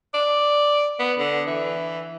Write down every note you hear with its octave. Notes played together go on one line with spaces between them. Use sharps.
D5
B3
D3
E3